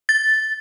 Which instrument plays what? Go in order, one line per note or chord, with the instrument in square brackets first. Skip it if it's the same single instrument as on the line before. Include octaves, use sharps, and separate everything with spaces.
[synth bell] A6